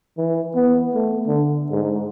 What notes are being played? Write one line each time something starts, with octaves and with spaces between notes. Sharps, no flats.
E3
B3
A3
D3
G#2